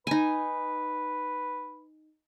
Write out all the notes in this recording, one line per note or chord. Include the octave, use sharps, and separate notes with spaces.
D#4 B4 G#5